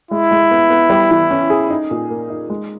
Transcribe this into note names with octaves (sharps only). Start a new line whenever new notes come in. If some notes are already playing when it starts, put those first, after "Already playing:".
G#3 E4
G#3
B3
B3
G3
E3
C#4
G#4
D#4
A#2
A#3
D#4
G#3